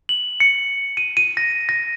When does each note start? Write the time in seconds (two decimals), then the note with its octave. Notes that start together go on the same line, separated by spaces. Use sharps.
0.09 F#7
0.40 C#7
0.97 D#7
1.17 D#7
1.37 A#6
1.69 A#6